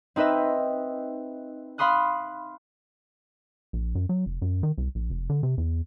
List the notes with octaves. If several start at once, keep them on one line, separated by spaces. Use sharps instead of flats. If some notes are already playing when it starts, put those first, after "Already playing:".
C4 D#4 B4 D#5 E5
F5 B5 C6 D#6 F#6
A#1
F#2
F#3
F1
F#2
D#3
C2
A#1
F1
D3
C3
E2